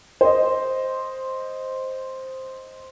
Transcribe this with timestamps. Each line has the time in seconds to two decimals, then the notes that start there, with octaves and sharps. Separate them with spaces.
0.21 C5 D#5